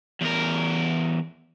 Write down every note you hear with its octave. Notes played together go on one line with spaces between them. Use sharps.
E2 A#4